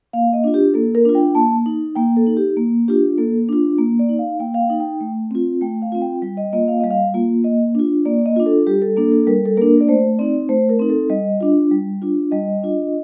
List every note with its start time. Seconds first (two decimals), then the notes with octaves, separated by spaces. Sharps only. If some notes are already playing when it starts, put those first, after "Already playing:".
0.13 A#3 F5
0.33 D#5
0.44 D4 F4
0.54 G4
0.74 A#3 A4
0.95 A#4
1.05 D4 F4
1.15 G5
1.35 A#3 A5
1.66 D#4
1.96 A#3 G5
2.17 A4
2.26 D#4
2.37 G4
2.57 A#3
2.88 D4 F4 G4
3.18 A#3 A4
3.49 D4 F4
3.78 A#3
3.99 D5
4.09 D#4
4.19 F5
4.39 A#3 G5
4.54 F5
4.61 G5
4.70 D#4
4.80 G5
5.01 A3
5.31 C4 F4
5.61 A3 G5
5.82 F5
5.92 C4 F4
6.02 G5
6.22 G3 G5
6.37 D#5
6.53 A#3 F4 D#5
6.68 F5
6.80 G3 D#5
6.91 F5
7.14 A#3 F4
7.44 A#3 D#5
7.75 D4 F4
8.05 A#3 D5
8.26 D#5
8.36 D4 F4
8.46 A4
8.67 G3 G4
8.82 A4
8.97 A#3 D4 A4
9.12 A4
9.27 G3 A#4
9.45 A4
9.57 A#3 D4 A#4
9.81 D5
9.88 A3 C5
10.19 C4 D#4 D5
10.49 A3 C5
10.69 A#4
10.79 C4 D#4
10.89 A4
11.10 G3 D#5
11.41 D4 F4
11.71 G3
12.02 D4 F4
12.31 G3 D#5
12.63 D4 F4